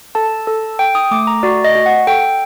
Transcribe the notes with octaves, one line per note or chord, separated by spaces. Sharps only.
A4 A5
A4
A4 G5
D#6
A3 D6
A#5
F#4 D5
D#5
F#4
F#5
A4 G5